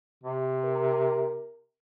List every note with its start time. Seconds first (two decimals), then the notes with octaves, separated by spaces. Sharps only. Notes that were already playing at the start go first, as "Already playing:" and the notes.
0.23 C3
0.65 A#4